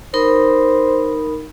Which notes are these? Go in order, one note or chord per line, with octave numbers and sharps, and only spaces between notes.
D#4 A#4 C5 B5